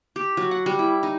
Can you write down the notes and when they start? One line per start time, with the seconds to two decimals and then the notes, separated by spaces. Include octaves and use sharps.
0.16 G4
0.37 F#3
0.51 F#5
0.66 G3
0.79 E4
1.03 D#4